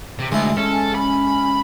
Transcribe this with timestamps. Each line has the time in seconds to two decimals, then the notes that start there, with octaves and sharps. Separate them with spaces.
0.19 C3
0.32 D2 G#3 E4
0.57 C#4 A4
0.95 B5